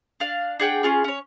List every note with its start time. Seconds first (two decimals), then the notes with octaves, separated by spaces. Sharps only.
0.20 D4 F5
0.60 D4 G#4 F#5 G5
0.83 C#4 F4 G#4
1.04 C#4 C#5